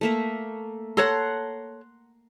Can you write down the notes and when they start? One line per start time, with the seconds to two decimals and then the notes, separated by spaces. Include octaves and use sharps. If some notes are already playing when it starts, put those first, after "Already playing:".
0.01 A3 A#3 E5
0.97 A4 C#5 F#5 A5 A#5 C6